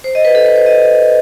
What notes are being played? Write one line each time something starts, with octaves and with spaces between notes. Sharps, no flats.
C5
D#5
B4
A4
B4
C5
D#5